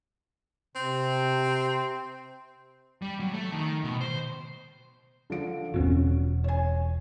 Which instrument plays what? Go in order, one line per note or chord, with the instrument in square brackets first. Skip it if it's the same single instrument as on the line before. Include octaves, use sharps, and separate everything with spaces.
[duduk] C3 [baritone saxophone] C4
[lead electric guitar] G3
F#3
A3
D#3
B2
C5
[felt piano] D3 F3 D7
[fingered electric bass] E1 E2 C4 [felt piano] C#4 F#4
[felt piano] C#5 G#5